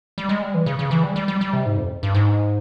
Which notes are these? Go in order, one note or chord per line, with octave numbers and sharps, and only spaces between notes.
G3
G#3
G3
E3
C#3
C#3
E3
G3
G3
G3
G3
C3
G#2
F2
G2
G#2